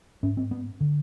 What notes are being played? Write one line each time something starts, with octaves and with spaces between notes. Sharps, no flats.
G#2 C#4
C4
B3
D3